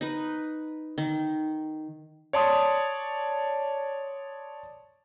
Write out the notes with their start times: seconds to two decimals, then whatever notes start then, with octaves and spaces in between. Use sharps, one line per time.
0.01 D#4 B4
0.98 D#3
2.33 C#5 D5 A5 C6 D#6